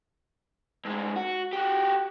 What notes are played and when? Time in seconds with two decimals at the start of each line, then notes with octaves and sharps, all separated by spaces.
0.85 G2 G#3
1.16 F#4
1.53 F#4 G4